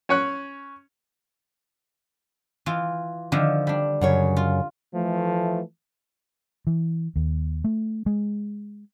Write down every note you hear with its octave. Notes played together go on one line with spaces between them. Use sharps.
C#4 C#5 F#6
E3 F4
D3 D#3 F3
G3 D4
F#2 C#3 C#5
F4
E3 F3 A3
E3
D#2
A3
G#3